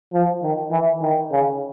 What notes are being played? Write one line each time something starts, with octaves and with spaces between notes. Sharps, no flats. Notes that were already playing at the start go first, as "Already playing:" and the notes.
F3
D#3
E3
D#3
C#3